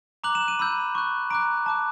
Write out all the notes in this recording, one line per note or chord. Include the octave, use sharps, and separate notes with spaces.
A#5 D6 F#6 F#7
E7
D#7
B5 E6 G6
C#6 F#6
A#5 D6 F#6 D7
A5 D6 F#6